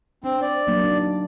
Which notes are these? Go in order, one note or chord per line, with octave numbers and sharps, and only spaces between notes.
C4 D4
D5
F#3 A#3 D4
D4 D#4